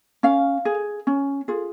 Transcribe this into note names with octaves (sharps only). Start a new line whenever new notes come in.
C#4 F5
G#4
C#4
F4 G#4